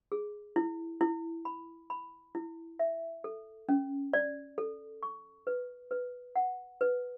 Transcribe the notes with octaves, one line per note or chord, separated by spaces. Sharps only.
G#4
E4
E4
B5
B5
E4
E5
A4
C#4
D5
A4
C#6
B4
B4
F#5
B4